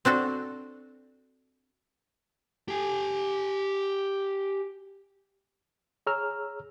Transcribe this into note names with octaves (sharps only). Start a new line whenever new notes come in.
C4 D4 F#4 A4
G4 G#5
G#4 C#5 A#5 E6 F6